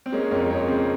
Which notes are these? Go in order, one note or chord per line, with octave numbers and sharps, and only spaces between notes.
C4
G#3 A#3 C#4
F2 A#3 C#4
G#3 A#3
C#3 C4